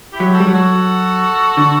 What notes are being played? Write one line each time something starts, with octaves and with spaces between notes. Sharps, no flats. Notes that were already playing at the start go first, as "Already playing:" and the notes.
E4 G4
F#3
F#4 A4
G3
F#3
F#4 A4
D3